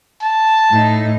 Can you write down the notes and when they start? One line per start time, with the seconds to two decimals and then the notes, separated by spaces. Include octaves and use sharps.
0.22 A5
0.71 A2 D#4